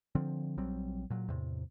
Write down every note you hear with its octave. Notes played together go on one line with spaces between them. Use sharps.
D3 F3 C4
A#1 F#3 G3 C4
A#2 F#3
E2 A2 C3